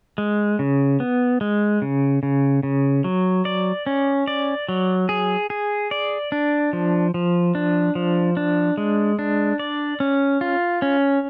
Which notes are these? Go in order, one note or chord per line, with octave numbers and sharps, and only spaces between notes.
G#3
C#3
B3
G#3
C#3
C#3
C#3
F#3
D5
C#4
D5
F#3
G#4
G#4
D5
D4
F3
F3
D4
F3
D4
G#3
D4
D5
C#4
F4
C#4